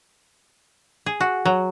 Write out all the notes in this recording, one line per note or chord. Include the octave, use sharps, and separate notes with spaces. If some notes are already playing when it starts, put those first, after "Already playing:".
G#4
F#4
F#3